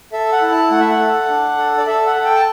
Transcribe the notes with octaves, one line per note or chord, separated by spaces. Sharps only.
A4 E5
F#5
E4
A5
A3 F#5
E5
F#5
A4
D4
A4
D5
A4 E5
F#5
A4
G5
A5